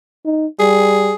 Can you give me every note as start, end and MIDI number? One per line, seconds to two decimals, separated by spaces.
0.25 0.46 63
0.59 1.13 55
0.59 1.15 68